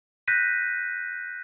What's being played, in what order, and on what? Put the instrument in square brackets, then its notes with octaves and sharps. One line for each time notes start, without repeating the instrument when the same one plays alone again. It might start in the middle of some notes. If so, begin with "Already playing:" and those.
[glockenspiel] F#6 G6 A#6 B6 D#7